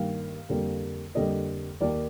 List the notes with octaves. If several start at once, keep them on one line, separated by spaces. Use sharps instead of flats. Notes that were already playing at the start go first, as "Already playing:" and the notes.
Already playing: G2 D#3 A#3 F5
F2 D3 G3 A#3
F2 D3 G3 A#3 D#5
D#2 D#3 A#3 D5